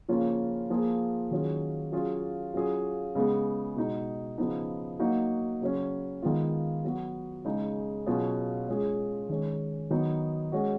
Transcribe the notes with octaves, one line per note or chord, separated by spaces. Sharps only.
C#3 F3 A#3 C#4 F4
F3 A#3 F4 G#4
D#3 F#3 C#4 F4 G#4
F#3 C#4 F4 G#4
F#3 C#4 F4 G#4
C#3 G#3 B3
B2 G#3 D#4 F#4
C#3 F3 B3 D#4
F#3 A#3 D#4 F#4
C#3 F#3 C#4
D#3 G#3 B3 F4
F#3 B3 F#4
C#3 G#3 D#4
B2 F#3 C#4 F4 G#4
G#3 C#4 F4 G#4
D#3 G#3 C#4
D#3 F#3 B3 D#4
G#3 C#4 F#4